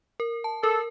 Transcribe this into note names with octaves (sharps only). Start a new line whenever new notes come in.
A#4
A5
A4 A#4